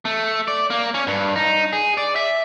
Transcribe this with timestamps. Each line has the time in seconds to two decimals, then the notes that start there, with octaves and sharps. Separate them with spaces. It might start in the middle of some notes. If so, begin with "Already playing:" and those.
0.05 A3
0.48 D5
0.70 A#3
0.94 C#4
1.07 G2
1.36 D#4
1.73 G#4
1.97 D5
2.16 E5